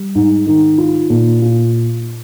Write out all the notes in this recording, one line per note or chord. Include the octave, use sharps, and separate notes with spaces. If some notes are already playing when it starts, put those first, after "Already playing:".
Already playing: G3
G#2
D#3
F4
A#2
F4